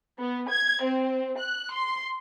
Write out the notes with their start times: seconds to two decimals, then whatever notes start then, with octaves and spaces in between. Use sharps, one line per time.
0.19 B3
0.50 G#6
0.83 C4
1.37 F#6
1.74 C6